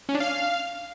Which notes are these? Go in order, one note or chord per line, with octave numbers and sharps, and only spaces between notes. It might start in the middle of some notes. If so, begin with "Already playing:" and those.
C#4
D4
F5